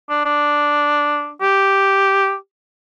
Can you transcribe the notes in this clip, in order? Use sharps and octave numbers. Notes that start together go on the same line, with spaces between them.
D4
D4
G4